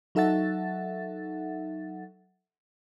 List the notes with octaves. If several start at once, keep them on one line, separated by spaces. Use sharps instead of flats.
F#3 D#4 A4 E5 F#5 A6